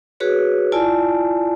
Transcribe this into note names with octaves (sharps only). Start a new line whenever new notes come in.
F#4 G#4 B4 C#5
E4 F4 D5 G#5 A5